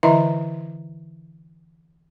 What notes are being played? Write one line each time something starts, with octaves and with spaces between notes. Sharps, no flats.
D3 E3 E4 D#5 E5 A#5